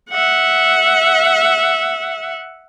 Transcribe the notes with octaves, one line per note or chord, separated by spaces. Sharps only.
E5 F#5